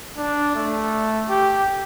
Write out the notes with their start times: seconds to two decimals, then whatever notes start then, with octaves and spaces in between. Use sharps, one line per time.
0.18 D4
0.56 A3
1.30 G4